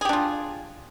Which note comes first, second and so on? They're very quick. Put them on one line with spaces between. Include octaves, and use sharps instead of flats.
G#4 G4 D4 F4